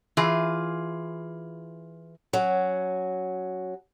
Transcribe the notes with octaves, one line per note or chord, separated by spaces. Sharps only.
E3 F4 G#4
F#3 C#4